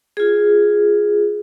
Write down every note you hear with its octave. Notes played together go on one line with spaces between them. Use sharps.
F4 G#4